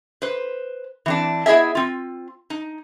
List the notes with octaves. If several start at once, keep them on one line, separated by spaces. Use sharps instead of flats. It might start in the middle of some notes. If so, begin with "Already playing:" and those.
B4 C5
E3 C4 D4
B3 E4 G#4 D#5 E5
C4 F4
D#4